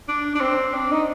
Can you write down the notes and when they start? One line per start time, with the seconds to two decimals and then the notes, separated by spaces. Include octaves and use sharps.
0.08 D4
0.35 D4
0.41 C4
0.74 D4
0.91 D#4